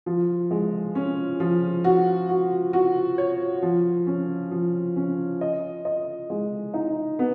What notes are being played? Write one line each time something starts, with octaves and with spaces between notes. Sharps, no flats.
F3
G#3
C#4
F3
F#4
F#4
F#4
C#5
F3
C#4
F3
C#4
D#5
D#5
G#3
D#4
B3